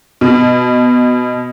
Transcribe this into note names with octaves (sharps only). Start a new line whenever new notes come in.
B2